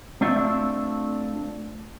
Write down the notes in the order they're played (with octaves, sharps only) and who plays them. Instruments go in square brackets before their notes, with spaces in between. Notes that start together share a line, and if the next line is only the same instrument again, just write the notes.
[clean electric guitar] A3 C4 D4 F4 E5